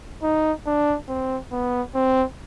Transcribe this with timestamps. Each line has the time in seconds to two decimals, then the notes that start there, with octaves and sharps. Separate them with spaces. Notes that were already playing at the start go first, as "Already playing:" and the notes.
0.23 D#4
0.66 D4
1.08 C4
1.52 B3
1.94 C4